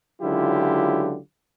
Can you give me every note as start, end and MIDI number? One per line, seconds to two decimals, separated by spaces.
0.22 1.18 37
0.22 1.18 50
0.22 1.18 54
0.22 1.18 64
0.22 1.18 65
0.22 1.18 67